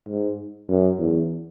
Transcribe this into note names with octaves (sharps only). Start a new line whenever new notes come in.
G#2
F#2
E2